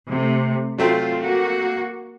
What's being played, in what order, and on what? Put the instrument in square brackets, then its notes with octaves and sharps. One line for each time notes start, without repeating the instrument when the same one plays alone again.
[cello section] C3 A3
[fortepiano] F#3 A3 C4 [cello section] F4
[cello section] A#3 F#4